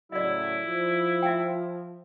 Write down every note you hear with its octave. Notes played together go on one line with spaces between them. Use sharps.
A2 C#3 F#3 E4 D5 D#5
F3
E5 G5